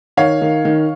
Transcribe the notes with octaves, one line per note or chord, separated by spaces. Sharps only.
D#3 C#5 F5
D#3
D#3